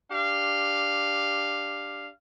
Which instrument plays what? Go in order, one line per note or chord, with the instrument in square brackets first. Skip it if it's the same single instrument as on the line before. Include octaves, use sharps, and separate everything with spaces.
[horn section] D4 G4 F5